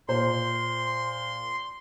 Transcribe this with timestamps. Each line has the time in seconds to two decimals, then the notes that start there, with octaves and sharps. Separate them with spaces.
0.08 A#2 C5 C6